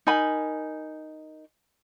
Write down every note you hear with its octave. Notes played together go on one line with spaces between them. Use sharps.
D#4 A#4 G#5 B5